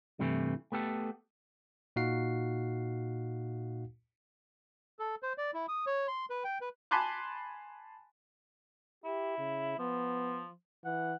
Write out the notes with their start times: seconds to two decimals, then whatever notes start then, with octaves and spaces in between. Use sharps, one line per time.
0.19 G2 C3 E3 A3
0.72 A3 B3 G4 A4
1.96 A#2 D#4 F#4 F5 F#5 C7
4.99 A4
5.23 C5
5.38 D5
5.54 E4
5.68 D#6
5.87 C#5
6.08 C6
6.30 B4
6.44 G5
6.61 B4
6.91 G#5 A5 B5 C6 D6 F#6
9.04 E4 G4
9.38 C#3
9.79 F3 B3
10.85 E3 F#5